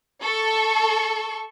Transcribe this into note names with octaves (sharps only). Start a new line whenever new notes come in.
A4 C#6